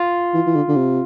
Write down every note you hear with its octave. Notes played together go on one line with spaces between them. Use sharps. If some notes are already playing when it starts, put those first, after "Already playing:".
Already playing: F4
E3
E3
D3
D3
C3